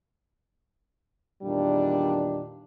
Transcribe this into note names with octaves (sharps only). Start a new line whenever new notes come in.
E2 A#2 D#3 G3 D4